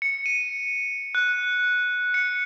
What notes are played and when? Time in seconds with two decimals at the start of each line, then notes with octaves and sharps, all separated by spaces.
0.02 C#7
0.26 D#7
1.15 F#6
2.14 C#7